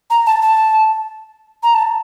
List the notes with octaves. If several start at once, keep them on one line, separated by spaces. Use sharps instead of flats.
A#5
A5
A5
A#5
A5